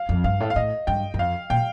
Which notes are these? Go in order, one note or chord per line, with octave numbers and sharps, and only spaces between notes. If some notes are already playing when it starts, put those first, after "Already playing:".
Already playing: F5
F2
G2 F5
A2
F5
A2 D#5
G2 G5
G2
F2 F5
A#2 G5